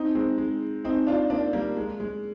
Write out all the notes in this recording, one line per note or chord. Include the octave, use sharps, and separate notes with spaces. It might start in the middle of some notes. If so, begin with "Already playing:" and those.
Already playing: C4 D#4
G#3 C4
G#3
C4 D#4
D4 F4
A#3 D4
G3 A#3
G#3
G#3